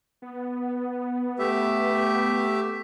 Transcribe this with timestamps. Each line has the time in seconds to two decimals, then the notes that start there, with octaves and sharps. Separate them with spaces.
0.22 B3
1.39 A3 G4 E5